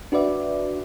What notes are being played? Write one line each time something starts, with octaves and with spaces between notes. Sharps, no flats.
D4 F#4 B4 D5 E5